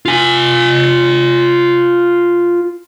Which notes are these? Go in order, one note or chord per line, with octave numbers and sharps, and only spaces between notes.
F4 G#5